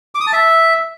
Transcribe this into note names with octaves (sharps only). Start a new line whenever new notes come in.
D6
D#6
A5
E5